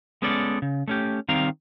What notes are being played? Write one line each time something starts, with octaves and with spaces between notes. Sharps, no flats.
G#3 B3 C#4 A4 D5
C#3
A3 C#4 G4
D#3 G3 C4 F5 A#5